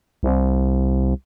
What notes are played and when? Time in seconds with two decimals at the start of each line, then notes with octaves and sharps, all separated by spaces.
0.23 C2